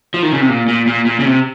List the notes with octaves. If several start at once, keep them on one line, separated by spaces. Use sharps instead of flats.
F3
D#3
C#3
C3
A#2
A#2
A#2
A#2
C#3
C3